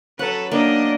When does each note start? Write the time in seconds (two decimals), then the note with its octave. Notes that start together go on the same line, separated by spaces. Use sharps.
0.19 F#3 C#4 A4 B4 F#5
0.52 D#3 A#3 B3 D4 D#4 D5 D#5